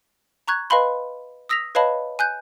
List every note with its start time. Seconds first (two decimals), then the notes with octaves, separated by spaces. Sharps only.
0.48 A#5 C#6 F#6 G#6
0.70 B4 D#5 F5 G#5 B5 C6
1.49 D#6 E6 A#6 B6 F7
1.75 B4 C#5 D#5 F5 A5 B5
2.19 G#5 F#6 G6